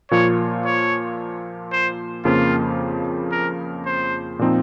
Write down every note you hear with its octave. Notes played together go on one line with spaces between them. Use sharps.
A#2 F3 A#3 F4 C#5
C#5
C5
F2 C#3 F3 A#3 F4
A#4
C5
A#2 F3 C4 D#4